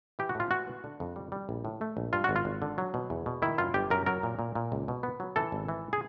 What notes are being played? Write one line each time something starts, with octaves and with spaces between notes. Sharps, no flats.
E3 G4
F#4
A2 F4
E3 F#4
B3
D3
F2
G3
G3
A#1
A2
A3
A#1
G2 F4
G#1 F#4
F4
G#1
D3
F#3
B2
E2
B2
D#3 E4
F#2 F4
G1 G4
F#2 A#4
F#3 A#4
A#2
A#2
A#2
C#2
B2
B3
F#3
E3 A4
G#1
E3
G#4